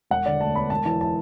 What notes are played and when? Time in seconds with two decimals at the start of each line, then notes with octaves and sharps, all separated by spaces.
0.11 E1 F#5
0.26 D3 D5
0.41 D2 A5
0.55 B3 B5
0.70 E1 A5
0.85 E3 A5
1.01 A5